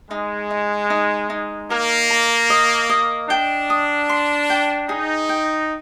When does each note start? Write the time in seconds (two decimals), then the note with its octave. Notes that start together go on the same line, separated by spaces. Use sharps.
0.10 G#3 D#4
0.51 D#4
0.90 D#4
1.30 D#4
1.70 A#3 A#4
2.10 A#5
2.50 D#5
2.90 D#5
3.30 D4 G5
3.70 D#6
4.09 C6
4.50 G5
4.89 D#4 G#4
5.29 G5